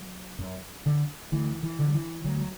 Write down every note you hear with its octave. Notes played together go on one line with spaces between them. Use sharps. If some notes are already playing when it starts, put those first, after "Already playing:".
Already playing: F#3
F#2
D3
D2 E3
E3
D3
F#3
E3
D2 F#3
F#3